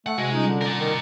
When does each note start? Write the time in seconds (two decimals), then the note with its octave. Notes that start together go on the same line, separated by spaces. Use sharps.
0.06 A3 F#5
0.18 C3 G#3 F#4
0.32 G3 C#4 D#4 F4
0.48 D3
0.61 A#4 D5
0.79 D#3